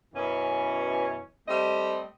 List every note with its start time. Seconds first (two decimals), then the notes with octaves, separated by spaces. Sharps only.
0.14 F#2 B2 E3 C#4
1.48 G3 A3 C4 D#5